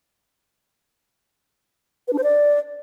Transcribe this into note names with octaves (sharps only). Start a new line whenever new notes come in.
B4
D4
C5
D5